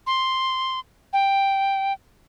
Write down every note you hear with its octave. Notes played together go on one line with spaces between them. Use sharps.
C6
G5